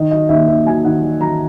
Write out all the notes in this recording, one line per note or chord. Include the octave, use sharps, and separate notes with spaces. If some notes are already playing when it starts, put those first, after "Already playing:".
Already playing: D#3 D#5
F#3 D#5
D#2 E5
D#2 E5
F#3 G#5
D#3 F#5
F#3
F#3 A#5